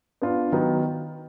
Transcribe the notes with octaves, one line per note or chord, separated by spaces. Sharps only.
B3 D4 F4
D#3 F#3 B3